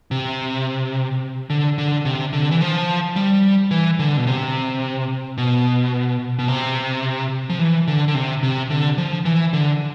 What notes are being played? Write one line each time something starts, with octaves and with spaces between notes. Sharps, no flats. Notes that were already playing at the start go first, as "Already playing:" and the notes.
C3
D3
D3
C3
D3
E3
F3
G3
E3
D3
B2
C3
B2
B2
C3
F3
E3
D3
D3
C3
C3
D3
F3
E3
D3